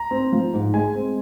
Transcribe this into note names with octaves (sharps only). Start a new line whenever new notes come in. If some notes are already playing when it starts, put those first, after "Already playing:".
Already playing: A#5
C4
F3
G#2
G#3 G#5
C4